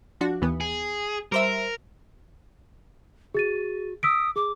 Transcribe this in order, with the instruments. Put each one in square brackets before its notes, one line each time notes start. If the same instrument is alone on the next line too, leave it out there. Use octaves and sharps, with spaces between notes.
[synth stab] F3 D4 F#4
D#2 E3 B3
[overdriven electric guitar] G#4
[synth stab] G3 C5 E5 [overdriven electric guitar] A#4
[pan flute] F#4 [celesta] G#4 A6 D#7
[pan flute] D#6 [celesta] E6 B6 D7
[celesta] G#4 [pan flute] D6